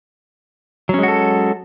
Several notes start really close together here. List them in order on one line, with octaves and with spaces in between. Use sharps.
F#3 C#4 G#3 F#4 A4